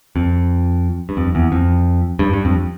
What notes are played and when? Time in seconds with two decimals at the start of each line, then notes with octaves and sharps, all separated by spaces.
0.16 F2
1.09 G2
1.17 F2
1.35 E2
1.52 F2
2.19 G2
2.33 G2
2.45 F2